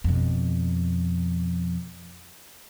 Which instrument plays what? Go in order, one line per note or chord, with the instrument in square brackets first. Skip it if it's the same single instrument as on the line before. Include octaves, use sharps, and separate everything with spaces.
[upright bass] F2 B2